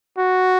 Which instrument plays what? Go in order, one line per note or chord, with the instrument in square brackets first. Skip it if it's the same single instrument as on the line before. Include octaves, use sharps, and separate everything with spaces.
[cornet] F#4